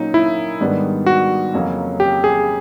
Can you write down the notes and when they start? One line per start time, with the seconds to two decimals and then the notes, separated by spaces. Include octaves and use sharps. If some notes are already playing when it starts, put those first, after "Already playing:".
Already playing: A#2 F#3 A#3 C#4 D#4
0.14 E4
0.60 G#2 D#3 G3 B3 D4
1.06 F#4
1.53 F2 C#3 F#3 A#3 C#4
2.00 G4
2.24 G#4